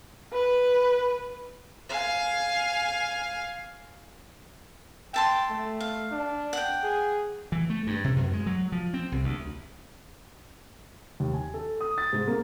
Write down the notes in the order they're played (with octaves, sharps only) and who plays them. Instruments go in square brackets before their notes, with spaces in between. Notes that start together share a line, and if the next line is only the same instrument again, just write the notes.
[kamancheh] B4
[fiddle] F5 G#5
[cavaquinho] E5 A5 C6 [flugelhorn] G5
[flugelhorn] A3
[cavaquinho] F5
[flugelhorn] D4
[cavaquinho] F#5 G5
[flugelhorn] G#4
[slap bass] E3
A3
G2
C3
F#2
G#3
F#3
F3
C4
C2
D2
[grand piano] D#2
G#5
A4
D#6
A6
G#2
A#3